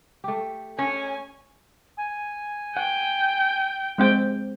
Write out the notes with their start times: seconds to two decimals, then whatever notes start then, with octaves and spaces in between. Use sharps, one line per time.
0.24 A3 G4
0.79 C#4 G#5
1.97 G#5
2.77 F#5 G5
3.98 G#3 C4 G5